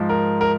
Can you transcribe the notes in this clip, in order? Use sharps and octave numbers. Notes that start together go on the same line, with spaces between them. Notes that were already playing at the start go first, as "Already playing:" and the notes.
Already playing: G#2 F3
A#4
A#4